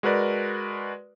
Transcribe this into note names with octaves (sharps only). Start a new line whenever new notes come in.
G#3 F#4 A#4 B4 D5